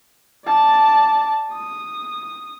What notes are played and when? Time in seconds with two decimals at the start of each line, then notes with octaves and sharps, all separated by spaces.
0.45 D5 A5
1.52 D#6